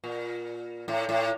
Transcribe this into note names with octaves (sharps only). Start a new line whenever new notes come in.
A#2
A2
A2